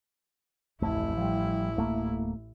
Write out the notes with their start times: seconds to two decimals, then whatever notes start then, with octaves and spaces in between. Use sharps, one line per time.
0.82 D1 A1 F2 A3 E4
1.17 F3 G3
1.76 D1 A3 A#3